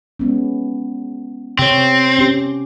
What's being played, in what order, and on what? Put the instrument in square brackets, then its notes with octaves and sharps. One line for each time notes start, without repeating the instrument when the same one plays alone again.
[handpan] G#3 B3 C#4
[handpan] C3 C#5 [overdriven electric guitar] C4
[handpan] C#4 G4